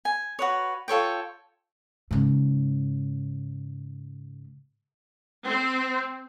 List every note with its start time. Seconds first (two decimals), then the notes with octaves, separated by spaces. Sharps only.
0.05 G#5
0.39 F#4 B4 C#5
0.88 F4 A4 C#5 G5
2.11 G#2 C#3
5.46 C4